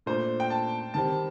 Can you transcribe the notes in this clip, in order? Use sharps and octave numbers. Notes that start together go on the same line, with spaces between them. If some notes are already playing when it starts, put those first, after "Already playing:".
A#2 A3 D4 C5
G5
A5
D#3 G3 C4 A5